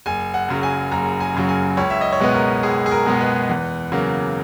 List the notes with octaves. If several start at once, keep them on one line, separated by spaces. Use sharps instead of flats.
F#1 G#5
F#5
F#2 C#3 F#3
G#5
F#1 A#5
G#5
F#2 C#3 F#3
G#5
C#2 C#5
E5
D#5
C#5
B2 G#3 B3 B4
A#4
C#2 G#4
G#4
A#4
B2 G#3 B3
B4
E2
C#3 F#3 A#3